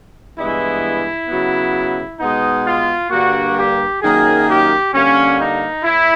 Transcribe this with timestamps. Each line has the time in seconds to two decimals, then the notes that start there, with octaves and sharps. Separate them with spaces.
0.37 G2 E3 G#3 B3 E4
1.28 C#3 F#3 B3
2.20 B2 G#3 B3 D#4
2.66 F4
3.11 G2 D3 G3 A#3 F#4
3.56 G4
4.02 F#2 D#3 F#3 A#3 G#4
4.48 G4
4.93 D3 G3 A#3 C#4
5.39 D#4
5.84 A2 E4